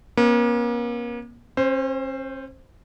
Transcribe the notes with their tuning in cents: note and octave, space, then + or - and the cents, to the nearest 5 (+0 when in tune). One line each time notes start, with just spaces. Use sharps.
A#3 +40 C#4 -35
C#4 -45 C5 +0